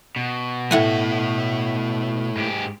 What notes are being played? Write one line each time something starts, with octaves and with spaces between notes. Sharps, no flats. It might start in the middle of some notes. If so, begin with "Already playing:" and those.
B2
A2 A3 E4 F#5 G#5
G#2 G4